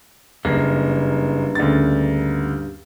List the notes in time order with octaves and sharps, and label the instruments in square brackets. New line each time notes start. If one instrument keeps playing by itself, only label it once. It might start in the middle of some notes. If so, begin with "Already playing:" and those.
[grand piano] F#1 [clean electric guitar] G2 A#3
[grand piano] D2 C#3 A6